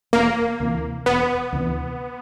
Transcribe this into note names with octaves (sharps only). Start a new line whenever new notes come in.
E1 A#3
D2 C3 E3
E1 B3
D2 C3 E3